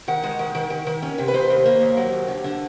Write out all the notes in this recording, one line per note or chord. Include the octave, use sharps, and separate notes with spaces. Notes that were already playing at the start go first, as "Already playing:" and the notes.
D#3 F#5
G#3
D#3
D#3
D#3
D#3
C#4
C3
B4
D#2 C5
D#2
A#3
D#2
F#3
D#2
D3
D3